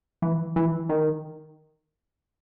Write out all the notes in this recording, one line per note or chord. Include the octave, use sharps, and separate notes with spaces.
E3
E3
D#3